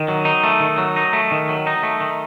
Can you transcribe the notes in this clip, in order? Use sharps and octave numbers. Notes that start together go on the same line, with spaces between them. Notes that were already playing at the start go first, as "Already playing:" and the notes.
Already playing: D#3
F#3
D#4
A3
D#3
F#3
D#4
A3
D#3
F#3
D#4
A3
D#3